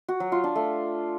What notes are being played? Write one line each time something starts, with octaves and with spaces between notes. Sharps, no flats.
F#4
F#3
F4
D4
A3